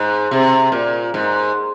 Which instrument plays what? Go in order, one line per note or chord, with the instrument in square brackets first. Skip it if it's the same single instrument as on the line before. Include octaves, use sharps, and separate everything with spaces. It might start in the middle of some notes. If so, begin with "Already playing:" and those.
Already playing: [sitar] G#2
C3
A#2
G#2